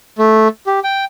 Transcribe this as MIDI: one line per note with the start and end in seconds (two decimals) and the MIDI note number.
0.18 0.48 57
0.66 0.80 67
0.84 1.05 79